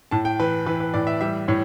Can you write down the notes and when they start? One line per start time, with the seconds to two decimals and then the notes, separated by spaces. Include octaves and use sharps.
0.11 A2 A5
0.25 G5
0.40 E3 B4
0.66 E3 B4
0.80 B4
0.94 A2 D5
1.07 E5
1.21 G3 E5
1.48 A2 C#5